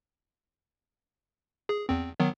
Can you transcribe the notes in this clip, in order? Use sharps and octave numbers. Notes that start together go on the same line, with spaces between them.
G#4
E2 C4
D#3 F#3 B3